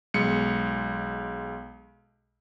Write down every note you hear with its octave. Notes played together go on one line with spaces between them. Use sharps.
B1 G#3 C#7